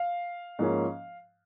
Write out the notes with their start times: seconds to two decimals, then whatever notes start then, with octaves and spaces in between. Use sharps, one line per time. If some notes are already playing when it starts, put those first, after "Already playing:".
Already playing: F5
0.59 G#2 F3 A#3 C#4